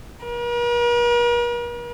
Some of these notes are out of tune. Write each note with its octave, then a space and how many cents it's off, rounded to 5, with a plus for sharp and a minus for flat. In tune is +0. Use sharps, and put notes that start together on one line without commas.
A#4 +45